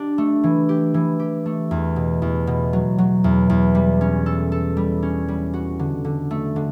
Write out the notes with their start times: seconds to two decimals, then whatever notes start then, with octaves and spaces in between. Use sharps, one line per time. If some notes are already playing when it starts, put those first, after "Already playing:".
Already playing: D4 G4
0.18 A3
0.44 E3
0.69 G4
0.94 E3
1.19 G4
1.46 A3
1.71 E2
1.96 B2
2.22 E2
2.47 B2
2.73 F#3
2.98 F#3
3.24 E2
3.50 E2
3.75 G3
4.01 C#4
4.26 A4
4.52 A4
4.77 G3
5.02 C#4
5.28 G3
5.54 F#4
5.79 D3
6.05 D3
6.31 A3
6.56 D3